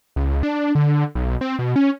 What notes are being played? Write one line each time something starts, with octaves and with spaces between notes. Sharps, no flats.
C#2
D4
D3
B1
C4
B2
C#4